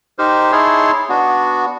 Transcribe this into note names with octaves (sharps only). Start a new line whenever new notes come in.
D#4 G4 A#4 C5
D#4 E4 G#4 C#5 A5 C6
B3 D4 F#4